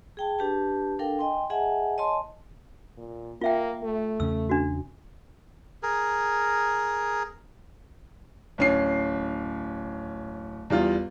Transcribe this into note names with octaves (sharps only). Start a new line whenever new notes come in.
G#4 G5 A5
D4 G4 B4 A5
D4 A4 A#4 F5 G5
D#5 G5 G#5 C6
G#4 D#5 E5 F#5 G#5 A5
C#5 D#5 G#5 A5 C6
A#2
A#3 F4 E5 G5
A3
E2 C#3 C#4 E6
D4 F#4
G#4 A#4
D1 C#4 C7
E2 G3 F4